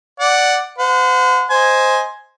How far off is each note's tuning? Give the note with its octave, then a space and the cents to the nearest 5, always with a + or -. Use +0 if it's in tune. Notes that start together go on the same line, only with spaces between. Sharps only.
D5 +0 F#5 +0
C5 -40 F#5 -30
C5 +0 D#5 +15 G#5 +0